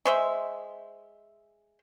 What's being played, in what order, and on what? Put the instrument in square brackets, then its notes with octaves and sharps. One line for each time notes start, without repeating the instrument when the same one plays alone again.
[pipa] G#3 C5 E5